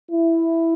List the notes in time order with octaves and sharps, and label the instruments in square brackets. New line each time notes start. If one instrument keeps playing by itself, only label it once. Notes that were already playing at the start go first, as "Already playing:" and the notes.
[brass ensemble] E4